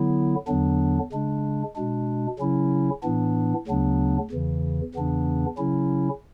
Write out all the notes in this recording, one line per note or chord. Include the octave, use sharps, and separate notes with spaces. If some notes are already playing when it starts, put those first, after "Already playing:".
Already playing: D3 F#3 B3 E4
E2 D3 F#3 B3 D4
C#3 G#3 D4
B2 G#3 D4
C#3 F#3 C#4 E4
A2 E3 B3 D4
D2 C#3 F#3 B3 D4
E2 C#3 E3
E2 C#3 E3 B3 D4
C#3 F#3 C#4 E4